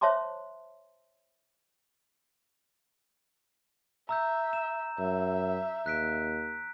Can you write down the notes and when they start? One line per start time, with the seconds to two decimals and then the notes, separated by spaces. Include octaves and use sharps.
0.01 C5 C#5 E5 A5 C6 D6
4.09 E5 A#5 E6 G6
4.53 E7
4.99 F#2 E5
5.86 D#2 F#6 B6 D7